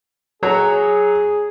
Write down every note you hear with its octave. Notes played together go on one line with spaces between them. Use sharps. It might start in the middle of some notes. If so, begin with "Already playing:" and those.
F#3 G#4 C#5 A#5